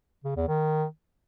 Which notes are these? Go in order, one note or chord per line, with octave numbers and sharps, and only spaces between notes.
C#3
E2
D#3